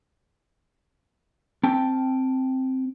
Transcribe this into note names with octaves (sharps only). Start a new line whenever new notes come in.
C4 G5 A5